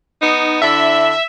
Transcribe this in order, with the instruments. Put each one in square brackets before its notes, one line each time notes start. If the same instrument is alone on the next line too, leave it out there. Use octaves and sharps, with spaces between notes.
[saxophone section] B3 D#4
[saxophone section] D3 D4 E4 [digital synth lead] E5